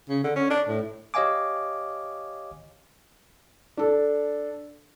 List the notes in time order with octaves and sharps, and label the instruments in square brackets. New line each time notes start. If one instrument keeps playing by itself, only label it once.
[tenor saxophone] C#3
D3
C#4
D4
A2
[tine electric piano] G4 C#5 D#5 F5 G#5 D6
[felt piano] D4 A4